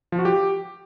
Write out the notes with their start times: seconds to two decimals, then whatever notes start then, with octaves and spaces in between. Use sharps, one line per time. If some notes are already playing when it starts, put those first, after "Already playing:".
0.12 F3
0.19 F#4
0.25 G4